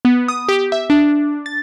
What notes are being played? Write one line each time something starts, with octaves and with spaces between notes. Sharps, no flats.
B3
D#6
G4
E5
D4
A6